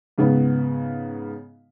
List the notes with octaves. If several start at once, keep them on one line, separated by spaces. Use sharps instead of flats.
G#2 C#3 B3